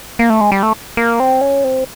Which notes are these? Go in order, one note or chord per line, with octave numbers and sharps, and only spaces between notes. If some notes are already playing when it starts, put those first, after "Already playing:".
A#3
A3
G#3
G3
A3
A#3
C4
C#4
C4